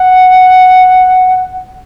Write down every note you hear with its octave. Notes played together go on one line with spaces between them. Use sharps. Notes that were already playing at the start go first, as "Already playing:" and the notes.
Already playing: F#5